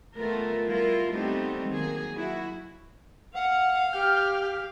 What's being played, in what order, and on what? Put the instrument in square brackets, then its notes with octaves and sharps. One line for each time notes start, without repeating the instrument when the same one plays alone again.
[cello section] A3 B3 F4 A#4
F#3 G3 E4 F4 A#4
G3 A3 B3 C4 D#4 G4
D#3 F#3 A#3 G#4
E4 F#4
[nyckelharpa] F5 [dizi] F#5
[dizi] G4 [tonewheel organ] G5 F6